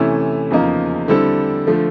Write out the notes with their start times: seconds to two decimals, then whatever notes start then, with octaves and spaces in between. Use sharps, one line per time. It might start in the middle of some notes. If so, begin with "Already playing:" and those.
Already playing: C3 E3 A3 C#4 E4
0.50 E2 C#3 F3 A#3 D#4
1.08 D3 G3 C4 E4 A4
1.67 D3 F3 A3